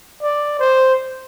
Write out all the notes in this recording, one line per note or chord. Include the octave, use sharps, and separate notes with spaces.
D5
C5